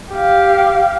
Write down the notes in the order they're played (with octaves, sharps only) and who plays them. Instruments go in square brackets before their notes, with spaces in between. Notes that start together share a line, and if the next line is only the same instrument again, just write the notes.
[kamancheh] G4 F5